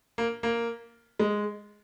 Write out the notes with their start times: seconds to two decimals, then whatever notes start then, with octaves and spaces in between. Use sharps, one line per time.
0.18 A#3
0.43 A#3
1.19 G#3